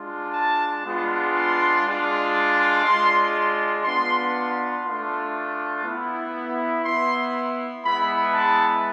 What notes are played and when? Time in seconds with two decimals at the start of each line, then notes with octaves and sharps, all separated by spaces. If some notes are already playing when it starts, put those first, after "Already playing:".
Already playing: G#3 D4 F4
0.34 A5
0.84 G#3 B3 D4 F4
1.35 C6
1.84 G#3 D4 F4
2.84 G#3 D4 F4 C6
3.83 B3 D4 F4 C6
4.83 A3 D4 F4 C6
5.84 B3 E4
6.83 B3 E4 C6
7.84 G#3 B3 E4 B5
8.33 A5